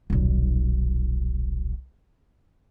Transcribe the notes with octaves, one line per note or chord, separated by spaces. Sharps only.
D#1 B1